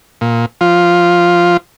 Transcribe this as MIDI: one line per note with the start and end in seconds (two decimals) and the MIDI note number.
0.21 0.46 46
0.61 1.57 53
0.61 1.57 65